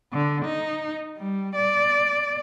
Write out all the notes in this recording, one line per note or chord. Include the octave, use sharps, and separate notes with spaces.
D3
D#4
G3
D5